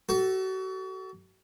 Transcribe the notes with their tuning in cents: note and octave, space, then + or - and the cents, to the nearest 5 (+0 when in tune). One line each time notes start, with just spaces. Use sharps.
F#4 +35 A4 +0